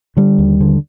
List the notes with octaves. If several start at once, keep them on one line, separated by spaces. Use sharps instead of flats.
D3 G3
D#2
D3